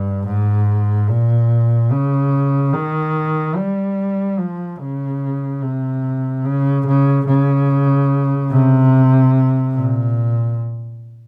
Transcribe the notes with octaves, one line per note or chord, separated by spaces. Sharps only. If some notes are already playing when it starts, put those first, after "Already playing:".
Already playing: G2
G#2
A#2
C#3
D#3
G3
F3
C#3
C3
C#3
C#3
C#3
C3
A#2